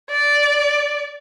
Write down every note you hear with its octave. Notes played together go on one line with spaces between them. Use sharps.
D5